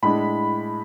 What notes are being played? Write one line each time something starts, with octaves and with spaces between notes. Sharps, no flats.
A2 G#3 D4 B5